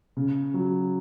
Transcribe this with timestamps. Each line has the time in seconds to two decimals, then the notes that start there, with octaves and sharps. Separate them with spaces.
0.17 C#3
0.54 F#3